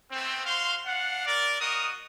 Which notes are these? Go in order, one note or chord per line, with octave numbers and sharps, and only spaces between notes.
A3 B3 C4
F#4 C5 F5 C6
D4 F5 F#5
A#4 D5
A#3 F#4 A#4 D#5 D#6